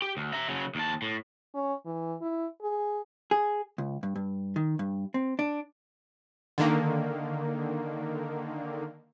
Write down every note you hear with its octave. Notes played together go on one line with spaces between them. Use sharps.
G4
D2
E5 A#5
C#3 F#3
D#2 A5
A2
C#4
E3
E4
G#4
G#4
C#2
G2
G2
D#3
G2
C4
D4
D3 D#3 A#3